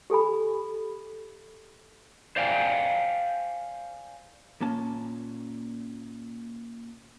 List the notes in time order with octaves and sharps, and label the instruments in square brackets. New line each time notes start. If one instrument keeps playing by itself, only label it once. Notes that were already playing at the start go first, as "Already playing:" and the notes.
[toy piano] G4 A4 G#5 B5
[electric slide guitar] C5 D5 F5 G5 G#5
[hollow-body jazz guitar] A#2 A#3 C#4 A5